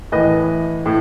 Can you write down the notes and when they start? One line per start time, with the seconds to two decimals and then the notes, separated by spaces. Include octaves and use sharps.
0.12 A2 E3 B4 D#5
0.86 A2